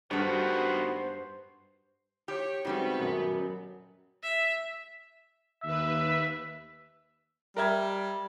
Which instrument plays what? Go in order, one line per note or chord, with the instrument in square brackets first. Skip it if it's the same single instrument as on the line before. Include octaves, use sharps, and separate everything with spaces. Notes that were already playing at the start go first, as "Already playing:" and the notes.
[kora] G2 A4 [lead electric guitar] D#3 B3 [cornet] F#4 [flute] C5
[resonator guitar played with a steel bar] G4 [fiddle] C#5 [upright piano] G6
[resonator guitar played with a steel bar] G#2 G3 A3 [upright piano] C#3 F#3 C4 [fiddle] B3
[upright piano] D#1 [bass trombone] F#2
[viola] E5
[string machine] D#2 B4 [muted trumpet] E5
[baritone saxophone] G3 [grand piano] A#4 E5 G#6